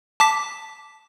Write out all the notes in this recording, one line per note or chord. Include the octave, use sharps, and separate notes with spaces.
A5 D6 B6